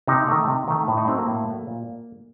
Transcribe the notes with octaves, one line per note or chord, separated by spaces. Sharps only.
C3 D#4
D#3 A3
C3
D#3 A3
A2
D#4
F#3 A3 C4
A#3
A2
F#3 A3
A#2